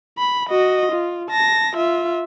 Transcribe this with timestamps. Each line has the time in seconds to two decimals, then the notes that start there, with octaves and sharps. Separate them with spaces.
0.18 B5
0.50 F#4 D#5
0.92 F4
1.31 A5 A#6
1.76 F4 E5